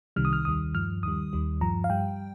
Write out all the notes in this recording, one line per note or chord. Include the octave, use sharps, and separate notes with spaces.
C2 C3 D#3 G3 F6
D#6
F6
D#2 D#3 G3 D#6
G2 F3 F6
D#2 D#3 G3 D#6
D#2 D#3 G3
G2 F3 A#5
F5
G2 G3 G5